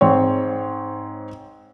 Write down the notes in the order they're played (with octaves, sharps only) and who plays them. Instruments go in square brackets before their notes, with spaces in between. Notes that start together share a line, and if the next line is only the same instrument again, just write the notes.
[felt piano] G#2 C4 C#5